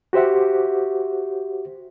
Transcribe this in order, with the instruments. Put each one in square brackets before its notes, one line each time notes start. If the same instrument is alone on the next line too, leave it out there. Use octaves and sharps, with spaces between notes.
[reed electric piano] F#4 G4 C5 E5 F#5